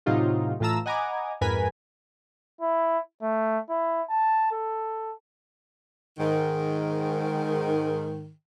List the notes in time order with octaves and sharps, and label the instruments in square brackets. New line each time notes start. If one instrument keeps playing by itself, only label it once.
[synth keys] A2 C3 F#3 D#4 F4 G4
A2 E3 F4 A5 A#5 E6
D#5 F#5 G#5 A#5 B5 D6
F2 G#2 A#4 B4 G#5 B6
[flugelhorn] E4
A3
E4
A5
A4
[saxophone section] G#2 D#3